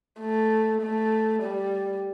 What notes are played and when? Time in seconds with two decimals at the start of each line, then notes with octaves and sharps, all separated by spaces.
0.20 A3
0.81 A3
1.42 G3